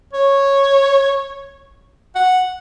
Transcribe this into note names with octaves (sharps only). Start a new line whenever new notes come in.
C#5
F#5